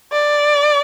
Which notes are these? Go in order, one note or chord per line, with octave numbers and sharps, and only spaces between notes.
D5